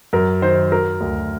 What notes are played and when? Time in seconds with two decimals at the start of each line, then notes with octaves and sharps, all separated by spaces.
0.13 F#2 A#4
0.42 D#3 C5
0.72 F#3 A#4
1.01 D2